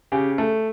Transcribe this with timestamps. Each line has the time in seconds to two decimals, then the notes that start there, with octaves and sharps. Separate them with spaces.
0.12 C#3 G4
0.38 A3